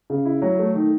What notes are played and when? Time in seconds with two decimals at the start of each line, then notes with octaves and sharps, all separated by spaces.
0.10 C#3
0.25 E4
0.42 F#3
0.59 A3
0.75 D#3